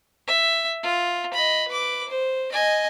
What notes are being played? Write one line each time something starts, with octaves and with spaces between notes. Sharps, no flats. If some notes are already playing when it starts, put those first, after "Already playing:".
E5
F4
D#5 B5
B4 D6
C5
D#5 G#5